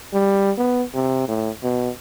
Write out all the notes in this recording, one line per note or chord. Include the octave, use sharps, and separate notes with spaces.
G3
B3
C3
A2
B2